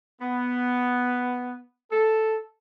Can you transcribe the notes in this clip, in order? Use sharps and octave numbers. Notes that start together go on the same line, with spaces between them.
B3
A4